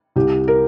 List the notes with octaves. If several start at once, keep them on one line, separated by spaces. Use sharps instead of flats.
C2 G4
A#4